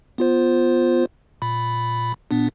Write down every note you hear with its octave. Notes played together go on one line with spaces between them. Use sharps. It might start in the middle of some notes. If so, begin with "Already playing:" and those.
B3 F4 C5
A#2 B5
A#2 B3 D4